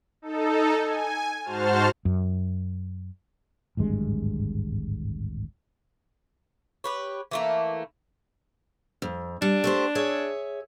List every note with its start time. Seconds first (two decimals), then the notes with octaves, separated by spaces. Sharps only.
0.22 D#4 A4
0.80 G#5
1.44 G#2 F#4 C5 A5 F6
2.05 F#2
3.77 D1 G#1 G2 G#3
6.84 G4 B4 C#5
7.31 E3 A3 A#3
9.02 F2
9.42 G3 D4
9.64 A3 G4 C5
9.95 G#4 C#5 E5